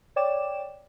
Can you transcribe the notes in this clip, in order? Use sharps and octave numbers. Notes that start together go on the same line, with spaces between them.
C#5 D5 G5 D6 E7